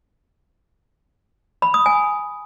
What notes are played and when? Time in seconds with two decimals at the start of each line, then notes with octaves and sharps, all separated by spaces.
1.62 B5
1.74 D#6
1.86 G#5